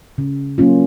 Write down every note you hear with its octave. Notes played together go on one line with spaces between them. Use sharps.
C#3
F#3 A#3 C#4 F4